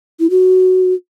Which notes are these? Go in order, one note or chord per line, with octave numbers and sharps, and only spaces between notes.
E4
F#4